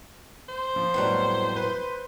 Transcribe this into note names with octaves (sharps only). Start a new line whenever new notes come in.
C5
F3
F2 A2 F#3 G3 B3
B4